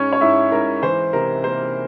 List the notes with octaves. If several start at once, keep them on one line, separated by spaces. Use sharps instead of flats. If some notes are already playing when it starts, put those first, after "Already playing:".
Already playing: G#2 C#4 C#5
C#5
G#2 E4 E5
G#2 A#4
E3 C5
C3 A#4
A#3 C5